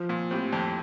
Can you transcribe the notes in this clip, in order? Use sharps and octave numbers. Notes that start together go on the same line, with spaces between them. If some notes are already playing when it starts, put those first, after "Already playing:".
Already playing: F3
A#2
A2 C4 G4
F2